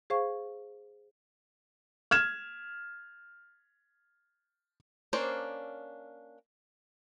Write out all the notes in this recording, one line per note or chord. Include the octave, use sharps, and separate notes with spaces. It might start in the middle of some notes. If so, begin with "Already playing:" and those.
G#4 C5 F5 C#6
F6 G#6 E7
A#3 C#4 D4 C5